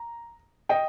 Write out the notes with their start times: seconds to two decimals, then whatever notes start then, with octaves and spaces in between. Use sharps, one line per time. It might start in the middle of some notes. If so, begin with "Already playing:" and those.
Already playing: A#5
0.69 D#5 G5